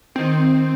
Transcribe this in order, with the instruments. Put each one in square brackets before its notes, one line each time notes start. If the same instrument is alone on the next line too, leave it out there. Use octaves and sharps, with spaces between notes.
[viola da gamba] D#3 [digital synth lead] C4